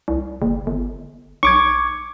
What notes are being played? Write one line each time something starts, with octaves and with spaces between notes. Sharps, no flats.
C2
F#1
G1
B1 C#6 D6 G#6